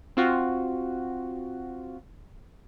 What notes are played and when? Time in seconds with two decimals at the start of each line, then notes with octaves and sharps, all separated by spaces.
0.17 C4 F4 F#4